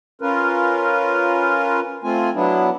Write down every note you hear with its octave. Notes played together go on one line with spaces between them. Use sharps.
C#4 F4 A#4 B4
A3 C4 F4 G#5
F#3 B3 D4 E4